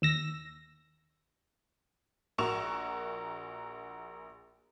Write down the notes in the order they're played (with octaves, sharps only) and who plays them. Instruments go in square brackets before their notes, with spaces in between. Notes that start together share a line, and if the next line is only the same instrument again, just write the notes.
[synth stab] D#2 E6 A#6
[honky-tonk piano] A#1 F#4 A#4 C#6 E7 F7